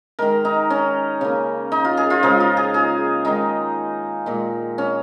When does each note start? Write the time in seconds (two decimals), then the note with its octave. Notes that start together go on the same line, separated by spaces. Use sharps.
0.19 D#3 G#3 A#4
0.45 D#4
0.70 C#4
1.21 C#3 A#3
1.72 D#4
1.85 F4
1.97 G#4
2.10 F4
2.23 C#3 F3 G#3 D#4
2.40 F4
2.57 G#4
2.74 G#4
3.25 D#3 G#3 D#4
4.26 A#2 G#3
4.78 C#4